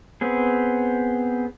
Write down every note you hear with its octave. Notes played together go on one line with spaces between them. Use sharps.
B3 C4 G#4